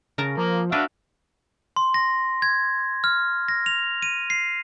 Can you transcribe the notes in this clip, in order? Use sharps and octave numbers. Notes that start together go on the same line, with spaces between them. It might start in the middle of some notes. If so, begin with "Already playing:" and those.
C#3 A#4 A5 A#5
F3 A#3
D4 F#4 B4 E5 F5
C6
A#6
G#6
F6
A#6
F7
D#7
C7